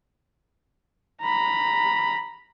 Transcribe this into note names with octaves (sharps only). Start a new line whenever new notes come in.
A#5 B5